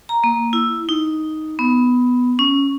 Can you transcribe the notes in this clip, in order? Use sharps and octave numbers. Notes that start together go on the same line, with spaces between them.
A#5
A#3
E4
D#4
B3
C#4